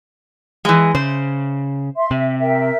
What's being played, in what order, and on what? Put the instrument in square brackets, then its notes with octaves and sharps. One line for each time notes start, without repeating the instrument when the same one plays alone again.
[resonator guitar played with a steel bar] E3 G#3
[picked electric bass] C#3 [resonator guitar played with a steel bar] C5
[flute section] E5 C6
[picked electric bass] C3 [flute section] E5
[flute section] A#4 E5 G5